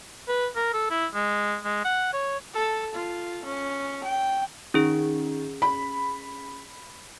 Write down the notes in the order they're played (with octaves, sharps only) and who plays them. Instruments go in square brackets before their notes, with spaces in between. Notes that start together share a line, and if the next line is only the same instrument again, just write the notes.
[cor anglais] B4
A#4
A4
E4
G#3
G#3
F#5
C#5
[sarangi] A4
F4
C#4
G5
[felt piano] D#3 [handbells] C#4 G#4
[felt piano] B5